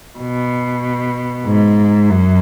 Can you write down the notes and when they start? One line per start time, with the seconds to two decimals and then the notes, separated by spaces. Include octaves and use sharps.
0.19 B2
1.46 G#2
2.09 F#2